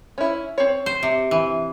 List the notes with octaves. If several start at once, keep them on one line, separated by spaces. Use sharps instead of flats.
C#4 E4
C4 C#5
C5
C3
E3